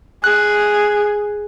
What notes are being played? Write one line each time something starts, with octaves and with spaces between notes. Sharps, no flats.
G#4 F#6